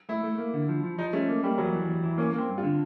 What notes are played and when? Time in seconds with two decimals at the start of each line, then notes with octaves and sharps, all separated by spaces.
0.09 A3 E4
0.24 A3
0.38 A#3
0.54 D3
0.69 F3
0.83 F3
0.98 F3 D#4
1.13 A3 C#4
1.28 A#3
1.43 G3 A#3
1.58 E2 F#3
1.74 E3
1.88 E2
2.03 E3
2.18 A#3 C#4
2.33 A#3 C4
2.48 G2
2.58 F4
2.63 D3